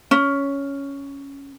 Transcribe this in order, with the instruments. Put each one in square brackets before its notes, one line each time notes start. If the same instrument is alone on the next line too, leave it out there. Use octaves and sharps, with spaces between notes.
[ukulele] C#4